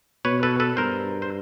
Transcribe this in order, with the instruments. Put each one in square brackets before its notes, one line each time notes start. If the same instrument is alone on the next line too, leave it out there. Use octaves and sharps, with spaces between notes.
[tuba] B2 [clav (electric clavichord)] B4 C#5
[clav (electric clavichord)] A4 B4
A4 B4
[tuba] G2 [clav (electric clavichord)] A#4 C5
[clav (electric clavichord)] C5